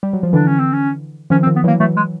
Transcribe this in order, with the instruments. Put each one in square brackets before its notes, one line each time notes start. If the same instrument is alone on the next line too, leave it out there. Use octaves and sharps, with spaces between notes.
[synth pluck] G3
F#3
F3
[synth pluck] D3 E3 [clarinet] D4
[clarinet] C#4
C4
C#4
[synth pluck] D#3 F3 [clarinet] C#4
[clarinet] C4
[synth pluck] D#3 F3
[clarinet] B3
[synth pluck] E3 F#3 [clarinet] A#3
[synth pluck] E3 F#3 [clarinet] A3
[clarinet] G#3